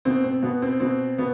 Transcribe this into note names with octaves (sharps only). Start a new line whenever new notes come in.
B2 C4
C4
B2 B3
C4
B2 C4
B2 B3